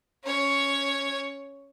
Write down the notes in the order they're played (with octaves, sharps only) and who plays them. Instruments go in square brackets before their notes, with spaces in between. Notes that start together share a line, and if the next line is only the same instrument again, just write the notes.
[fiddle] C#4 C#5